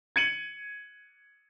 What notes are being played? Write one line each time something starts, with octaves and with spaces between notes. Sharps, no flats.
G#6 C#7 D#7 F#7